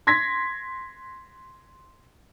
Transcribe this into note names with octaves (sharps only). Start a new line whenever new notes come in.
C6 G#6 A#6 B6